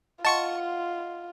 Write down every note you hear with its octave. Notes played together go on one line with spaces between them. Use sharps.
F4 D#5 F#5 A5 C6 C#6 C#7